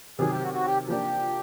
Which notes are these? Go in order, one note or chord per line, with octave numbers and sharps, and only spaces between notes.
C3 D#3 F#3 G#4
G4
F#4
F#4
G4
F3 A#3 D4 G4